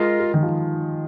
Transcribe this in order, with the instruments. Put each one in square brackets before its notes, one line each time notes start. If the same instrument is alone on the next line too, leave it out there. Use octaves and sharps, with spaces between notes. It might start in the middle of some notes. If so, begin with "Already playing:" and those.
Already playing: [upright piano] G#3 [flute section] F4 A#4 D#5
[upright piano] G#3
D#3
F3